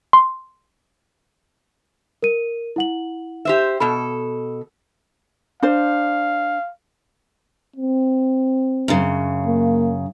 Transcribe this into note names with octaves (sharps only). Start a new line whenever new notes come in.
C6
A#4 D#7
E4 F#5 F#7
G4 C5 E5
B2 A4 B5
D4 C5 F5
C4
F#2 C#3
A#3